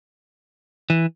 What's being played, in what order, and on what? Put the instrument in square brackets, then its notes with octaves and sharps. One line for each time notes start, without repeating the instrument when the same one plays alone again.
[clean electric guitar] E3